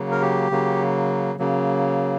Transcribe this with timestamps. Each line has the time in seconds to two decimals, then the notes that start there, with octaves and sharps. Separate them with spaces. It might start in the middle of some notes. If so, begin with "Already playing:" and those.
Already playing: C#3 F#3 A#3
0.11 A#4
0.22 G4
0.51 C#3 F#3 A#3
1.39 C#3 F#3 A#3